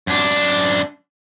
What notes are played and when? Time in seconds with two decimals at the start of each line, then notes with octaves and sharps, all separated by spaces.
0.07 F#2 D4